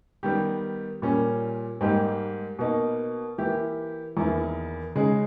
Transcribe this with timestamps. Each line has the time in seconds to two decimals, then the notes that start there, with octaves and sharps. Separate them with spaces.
0.23 D#3 G3 B3 G4
1.02 A#2 G3 A#3 C#4
1.81 G#2 G3 A#3 D#4 G4
2.59 B2 A#3 D#4
3.38 E3 A#3 E4 G4
4.17 E2 D#3 A#3 E4
4.95 C#3 G#3 D#4 G#4